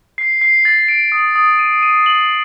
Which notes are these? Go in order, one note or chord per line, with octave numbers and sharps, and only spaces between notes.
C7
C7
A6
D7
D#6
D#6
D#7
D#7
F#7